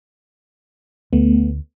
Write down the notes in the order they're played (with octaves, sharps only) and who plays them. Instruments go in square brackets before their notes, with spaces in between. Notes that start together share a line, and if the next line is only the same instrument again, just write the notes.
[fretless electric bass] D2 [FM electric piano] A3 B3